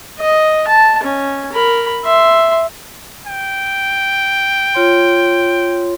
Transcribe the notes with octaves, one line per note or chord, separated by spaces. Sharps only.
D#5
A5
C#4
A#4 B5
E5 C6
G5
F4 C#5 C6